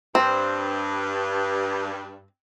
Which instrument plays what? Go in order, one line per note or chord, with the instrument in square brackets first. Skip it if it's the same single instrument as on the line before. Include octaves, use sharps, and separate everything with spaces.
[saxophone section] G2 [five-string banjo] C4